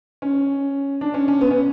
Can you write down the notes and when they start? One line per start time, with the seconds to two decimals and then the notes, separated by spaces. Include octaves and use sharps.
0.22 C#4
1.01 D4
1.14 C#4
1.28 C#4
1.41 B3
1.51 C#4